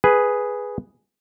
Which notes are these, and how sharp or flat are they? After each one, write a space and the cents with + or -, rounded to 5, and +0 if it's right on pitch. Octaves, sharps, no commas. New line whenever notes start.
G#4 +0 B4 +0